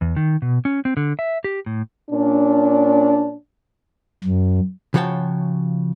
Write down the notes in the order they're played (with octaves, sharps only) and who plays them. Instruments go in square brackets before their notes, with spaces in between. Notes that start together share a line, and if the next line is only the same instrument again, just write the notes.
[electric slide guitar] E2
D#3
B2
C#4
C4
D3
E5
G4
A2
[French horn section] A#2 C#4 D4
[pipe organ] F#2
[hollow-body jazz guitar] C#3 F3 F#4 C#5 G5 A5